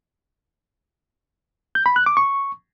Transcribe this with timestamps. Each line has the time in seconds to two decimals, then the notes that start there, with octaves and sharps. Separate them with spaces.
1.75 G6
1.86 B5
1.96 F#6
2.06 D6
2.17 C#6